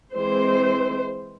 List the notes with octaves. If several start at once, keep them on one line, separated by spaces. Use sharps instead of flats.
E3 G#3 C4 C5